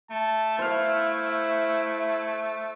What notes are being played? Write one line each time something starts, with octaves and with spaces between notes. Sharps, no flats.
A3 A5
E4 C5 F5